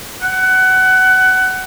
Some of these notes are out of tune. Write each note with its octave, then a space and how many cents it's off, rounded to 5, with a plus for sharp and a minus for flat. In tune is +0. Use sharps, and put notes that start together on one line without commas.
F#5 +20